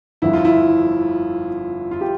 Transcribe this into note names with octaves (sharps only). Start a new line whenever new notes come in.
G1 F2 D3 F3 E4
F4
E4
F4
G4